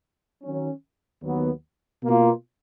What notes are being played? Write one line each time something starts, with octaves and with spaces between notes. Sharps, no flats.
D#3 F#3 C#4
D#2 D#3 F#3 B3
B2 A#3 F4